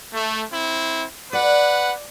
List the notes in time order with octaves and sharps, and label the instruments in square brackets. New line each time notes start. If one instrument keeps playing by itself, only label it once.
[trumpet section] A3
C4 E4
[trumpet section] B4 F#5 [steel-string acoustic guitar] D5